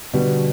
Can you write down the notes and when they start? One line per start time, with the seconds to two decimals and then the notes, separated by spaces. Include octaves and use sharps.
0.13 B2 D3 G3 B3 F#4